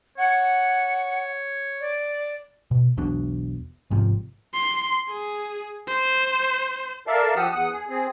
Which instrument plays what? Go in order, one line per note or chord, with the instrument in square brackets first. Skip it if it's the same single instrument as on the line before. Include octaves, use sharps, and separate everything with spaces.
[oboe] C#5 [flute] F#5
[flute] D5
[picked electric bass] B2
E1 B1 B2 D4
G#1 G#2 C3 F3
[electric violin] C6
G#4
C5
[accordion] A4 A#4 D5 E5 F5 A5
F3 G4 F#5 D#6 E6
E2 F#5 D#6
G#4
C4 G#4